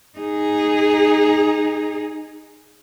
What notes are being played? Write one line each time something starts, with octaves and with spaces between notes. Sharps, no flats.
D#4 G#4